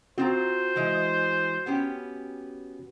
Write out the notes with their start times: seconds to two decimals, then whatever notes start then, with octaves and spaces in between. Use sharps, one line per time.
0.18 C4 F4 F#4 C5 A#5
0.76 E3 G#3 D#5
1.66 B3 C#4 G4